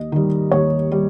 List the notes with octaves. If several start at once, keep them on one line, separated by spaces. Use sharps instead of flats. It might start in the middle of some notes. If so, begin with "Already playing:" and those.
Already playing: D#2 D#5
D#3 G3
D#2 C#5
G3